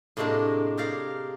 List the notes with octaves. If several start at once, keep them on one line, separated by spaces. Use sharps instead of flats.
A2 C3 G#3 A#3 D4
G4 G#4 A#4 D5 F5